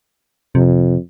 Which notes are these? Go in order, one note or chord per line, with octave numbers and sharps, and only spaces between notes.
F2 C3